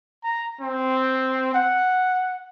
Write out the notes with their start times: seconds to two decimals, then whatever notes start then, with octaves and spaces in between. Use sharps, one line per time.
0.24 A#5
0.61 C4
1.54 F#5